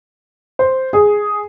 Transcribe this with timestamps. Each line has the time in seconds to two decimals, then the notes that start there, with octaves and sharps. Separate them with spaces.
0.59 C5
0.93 G#4